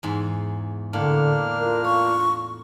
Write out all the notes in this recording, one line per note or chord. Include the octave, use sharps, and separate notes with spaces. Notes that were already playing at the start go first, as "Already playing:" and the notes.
E2 G#2
A2 D3 A#3 D4 F6
F4 A#4
C#5 C#6